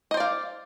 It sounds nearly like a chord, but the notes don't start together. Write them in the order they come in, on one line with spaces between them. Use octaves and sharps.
D#5 C5 D5 F5